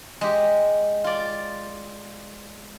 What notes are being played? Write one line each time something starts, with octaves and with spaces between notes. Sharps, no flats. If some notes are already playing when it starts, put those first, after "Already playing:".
G#3 G4
F4 D5